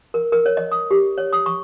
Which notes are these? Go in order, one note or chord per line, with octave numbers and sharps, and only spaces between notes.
A#4
A#4
C#5
D#5
D#6
G4
C#5
D#6
C#6